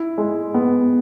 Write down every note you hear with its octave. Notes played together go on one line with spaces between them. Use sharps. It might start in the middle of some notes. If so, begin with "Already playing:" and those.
Already playing: E4
G#3
B3